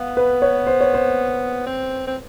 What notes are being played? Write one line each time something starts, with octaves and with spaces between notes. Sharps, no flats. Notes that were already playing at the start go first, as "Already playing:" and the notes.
Already playing: B3 F5
B4
C#5
C5
C#5
C5
C4
C4